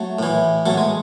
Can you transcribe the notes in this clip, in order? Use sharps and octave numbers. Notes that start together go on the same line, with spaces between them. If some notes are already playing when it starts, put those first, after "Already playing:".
Already playing: F#3 A3
A2 E3
F#3 A3
G#3